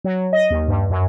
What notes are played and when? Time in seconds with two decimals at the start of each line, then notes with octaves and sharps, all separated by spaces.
0.04 F#3
0.33 D#5
0.50 D#2
0.68 G2
0.90 F#2